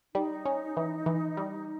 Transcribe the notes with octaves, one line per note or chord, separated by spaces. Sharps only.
G3 D#4
C#4
E3
E3
G3